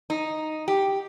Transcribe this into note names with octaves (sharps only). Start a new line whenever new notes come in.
D#4
G4